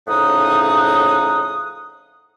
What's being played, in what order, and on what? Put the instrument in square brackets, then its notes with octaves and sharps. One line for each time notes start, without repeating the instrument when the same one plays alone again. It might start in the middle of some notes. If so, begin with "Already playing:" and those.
[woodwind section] F2 A2 C#3 D#4 F#5 D#6